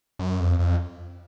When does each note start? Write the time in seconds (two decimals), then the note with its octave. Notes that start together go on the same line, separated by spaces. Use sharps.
0.19 F#2
0.40 F2
0.59 F2